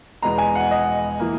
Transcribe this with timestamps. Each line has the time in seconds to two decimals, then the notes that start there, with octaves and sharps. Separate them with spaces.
0.22 E2 B2 G#3 B3 A#5
0.38 G#5
0.55 F#5
0.71 D#5
1.20 E3 A#3